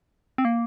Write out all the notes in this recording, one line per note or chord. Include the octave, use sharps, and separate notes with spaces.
C4
A#3